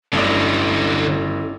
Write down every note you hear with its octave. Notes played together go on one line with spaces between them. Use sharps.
G1 D3 F#3 C#4 E4 A4 D5